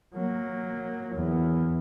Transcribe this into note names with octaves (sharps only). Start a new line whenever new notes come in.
F#3 A#3
E2